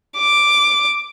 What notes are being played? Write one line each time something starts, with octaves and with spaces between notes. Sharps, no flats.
D6